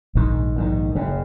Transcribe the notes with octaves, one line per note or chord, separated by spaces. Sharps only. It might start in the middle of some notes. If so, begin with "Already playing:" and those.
A#1 G#2 D#3
A#1 G#2 D#3
F#1 F#2 C#3